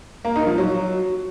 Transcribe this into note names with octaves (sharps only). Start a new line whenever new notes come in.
A#3
D#4
F3
F#3